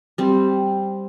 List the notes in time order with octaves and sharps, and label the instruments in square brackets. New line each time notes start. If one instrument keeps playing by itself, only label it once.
[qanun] G3 C4